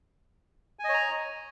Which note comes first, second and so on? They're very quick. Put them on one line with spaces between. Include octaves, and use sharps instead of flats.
G#5 D#5 C#5 A#5